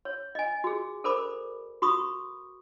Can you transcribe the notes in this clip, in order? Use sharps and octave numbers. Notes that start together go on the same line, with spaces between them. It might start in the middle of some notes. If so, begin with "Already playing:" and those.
C#5
D#5 G#5
F#4 G#4
A4 A#4 C5 D5 B5 D6
F#4 B5 C#6 D#6